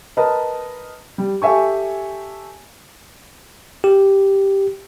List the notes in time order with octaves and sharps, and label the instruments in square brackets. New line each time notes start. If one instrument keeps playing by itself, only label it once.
[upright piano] A#4 B4 D#5 A5
G3
G4 A4 E5 G#5 C#6
[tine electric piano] G4